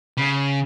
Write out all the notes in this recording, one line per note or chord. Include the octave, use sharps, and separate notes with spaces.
C#3